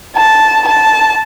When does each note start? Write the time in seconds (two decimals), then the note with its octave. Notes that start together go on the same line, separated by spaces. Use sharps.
0.16 A5
0.68 A5